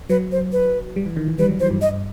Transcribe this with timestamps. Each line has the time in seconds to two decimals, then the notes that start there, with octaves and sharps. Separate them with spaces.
0.10 F#3 B4
0.32 C5
0.52 B4
0.96 G3
1.06 E3
1.17 D#3
1.28 E3
1.39 G3 B4
1.49 F#3
1.60 E3 C5
1.71 G2
1.82 G2 D#5